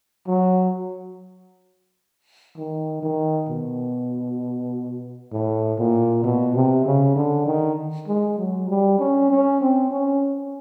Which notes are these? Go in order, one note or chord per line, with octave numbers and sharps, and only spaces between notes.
F#3
D#3
D#3
B2
A2
A#2
B2
C3
C#3
D3
D#3
G#3
F#3
G3
C#4
C#4
C4
C#4